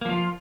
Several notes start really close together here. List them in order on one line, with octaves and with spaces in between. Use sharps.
A#3 F3 F4